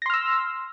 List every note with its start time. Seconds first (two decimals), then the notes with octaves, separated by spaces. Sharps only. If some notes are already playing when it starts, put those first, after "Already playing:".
0.02 A#6
0.06 C6
0.10 F6
0.14 E6